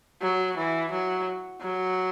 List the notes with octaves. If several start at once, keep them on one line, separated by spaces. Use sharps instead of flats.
F#3
E3
F#3
F#3